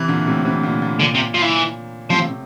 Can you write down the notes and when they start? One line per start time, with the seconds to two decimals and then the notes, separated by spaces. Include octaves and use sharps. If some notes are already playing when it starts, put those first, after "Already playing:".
Already playing: C3 E3
0.08 A#2 D3
0.27 A2 C3
0.45 C3 E3
0.63 A#2 D3
0.82 A#2
1.00 A#2 D3
1.14 C3
1.34 F3
1.42 E3
2.09 A2 C3 F3
2.28 A2 C3